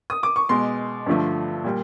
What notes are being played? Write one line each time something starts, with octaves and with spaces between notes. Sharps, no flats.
D#6
D6
C#6
B2 G#3 C6
G2 D3 F3 A3
A#2 G3